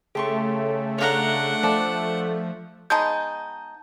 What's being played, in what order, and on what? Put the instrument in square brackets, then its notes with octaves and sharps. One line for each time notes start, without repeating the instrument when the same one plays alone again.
[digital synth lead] C#3 [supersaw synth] A3 [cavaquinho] G4 C6 C#6
[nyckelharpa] D4 F#5 [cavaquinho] C#5 F5 A#5
[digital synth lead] F3 [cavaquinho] D5 A5
[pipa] G#3 B3 D#4 [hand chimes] A5 G6